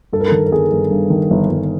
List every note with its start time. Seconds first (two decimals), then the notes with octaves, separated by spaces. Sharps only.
0.13 G2 A4
0.20 A#4
0.28 D#3 A4
0.46 A4
0.52 G1 G#4
0.71 G1
0.91 G2
1.10 D#3
1.31 G1
1.50 G1